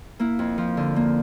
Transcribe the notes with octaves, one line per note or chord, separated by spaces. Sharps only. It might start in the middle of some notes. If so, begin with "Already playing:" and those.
A#3 E4
F2
F3
D3
A#3